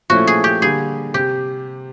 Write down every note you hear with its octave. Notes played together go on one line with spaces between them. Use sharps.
A#2 F3 A3 C#4 E4 F#4
G#4
G4
D3 G3 A#3 G#4
C3 G4